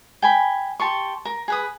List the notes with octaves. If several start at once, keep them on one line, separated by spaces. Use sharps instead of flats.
G5 G#5 B5
G4 A5 C6 C#6
A#4
G#4 B4 D#6